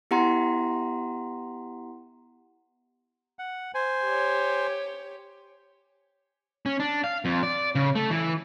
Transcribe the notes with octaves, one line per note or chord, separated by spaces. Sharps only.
B3 E4 G4 F#5 A#5 C6
F#5
C5 G#5
G4 C#5
C#4
D4
F5
F2
D5
C#3
A3
E3